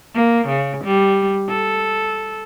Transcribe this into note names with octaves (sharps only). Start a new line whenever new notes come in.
A#3
C#3
G3
A4